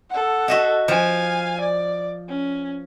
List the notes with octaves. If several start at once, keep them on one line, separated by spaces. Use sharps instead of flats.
A4 F#5
F#4 D#5 E5
F3 F5 G#5
D5
C#4